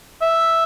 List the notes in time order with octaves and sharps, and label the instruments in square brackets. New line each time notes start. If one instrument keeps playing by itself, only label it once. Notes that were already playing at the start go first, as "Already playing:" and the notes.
[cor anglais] E5